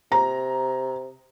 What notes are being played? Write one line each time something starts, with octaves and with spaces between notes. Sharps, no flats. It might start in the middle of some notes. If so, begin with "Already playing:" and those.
C3 A#5